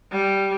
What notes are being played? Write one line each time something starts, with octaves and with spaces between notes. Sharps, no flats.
G3